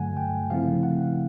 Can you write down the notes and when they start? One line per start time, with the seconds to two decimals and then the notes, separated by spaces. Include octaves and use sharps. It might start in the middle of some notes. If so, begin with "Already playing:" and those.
Already playing: G2 D3 F#3 A3 F#5 G#5
0.17 G5
0.50 C#3 F3 A3 C4 E4 F5
0.83 F#5